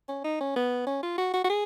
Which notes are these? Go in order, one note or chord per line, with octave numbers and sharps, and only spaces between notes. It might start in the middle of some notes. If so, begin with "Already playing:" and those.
C#4
D#4
C#4
B3
C#4
F4
F#4
F#4
F#4
G#4